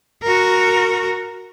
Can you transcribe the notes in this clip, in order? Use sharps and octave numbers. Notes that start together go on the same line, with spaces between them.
F#4 A#4